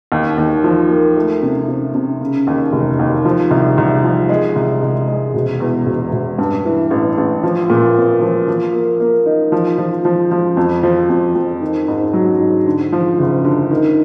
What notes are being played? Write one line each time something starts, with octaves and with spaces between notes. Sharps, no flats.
D#2
D#2
F3
A#3
A3
C3
C3
C3
C#3
D#2
F1
D#2
F3
C2
C2
F3
G#3
C2
C2
G#3
E1
E2
E1
E1
G2
E3
A1
A1
F3
A#2
C4
F3
F3
A#3
A#3
D#4
F3
F3
F3
F3
F2
F3
F2
F2
D#3
G#2
F#3
G#2
D3
F3
F#1
D3
D#3